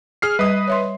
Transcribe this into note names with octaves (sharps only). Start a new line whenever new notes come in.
G#4 F6 C7
G3 B4 D#5 D#6
C#5 E5 C6